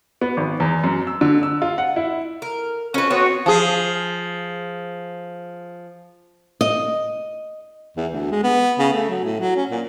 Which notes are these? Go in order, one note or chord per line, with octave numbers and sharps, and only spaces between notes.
B3
G#1
E2
F#2
E6
D3
E6
F4
F#5
E4
A#4
F2 C#4 F#4 B4
B3 C4 F#4 C#5
F3 G#4
D#5
E2
D2
G#3
B3
C#3
A3
F#3
A2
F#3
C#4
A#2